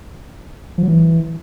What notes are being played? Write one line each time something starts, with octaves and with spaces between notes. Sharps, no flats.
F3
F#3
E3